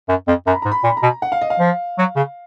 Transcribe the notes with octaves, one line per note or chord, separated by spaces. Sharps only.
F#2
F2
F#2 A#5
B5
G#2 A#5
B5
A#2
B5
A#5
B2
F#5
F5
D#5
F5
F3
F#3
C#3